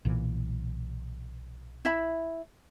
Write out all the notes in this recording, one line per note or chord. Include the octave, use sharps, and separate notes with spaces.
B1 A#2 E3
E4 E5 B5